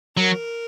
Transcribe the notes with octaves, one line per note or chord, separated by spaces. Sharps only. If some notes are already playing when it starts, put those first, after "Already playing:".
F#3 A#4